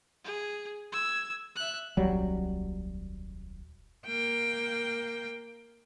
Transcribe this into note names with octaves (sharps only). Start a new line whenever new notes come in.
G#4
E6 G#6
E5 F#6
D#1 C2 F#3 G3
A#3 G5